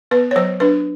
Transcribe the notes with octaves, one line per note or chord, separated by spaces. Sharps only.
B3 B4
C#5
F#3 C5
D4 B4